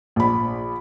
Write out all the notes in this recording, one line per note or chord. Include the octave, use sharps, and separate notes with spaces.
A#1 B5